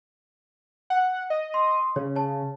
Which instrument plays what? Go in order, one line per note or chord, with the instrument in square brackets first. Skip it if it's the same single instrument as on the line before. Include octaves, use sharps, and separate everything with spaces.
[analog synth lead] F#5
D#5
[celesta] C6
[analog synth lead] C#3 [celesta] C#5
[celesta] C#5 A5